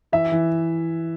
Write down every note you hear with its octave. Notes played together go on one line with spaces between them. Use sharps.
E3 E5
E3